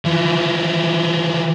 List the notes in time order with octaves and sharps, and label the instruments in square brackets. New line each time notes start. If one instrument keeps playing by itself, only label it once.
[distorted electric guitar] E3 F3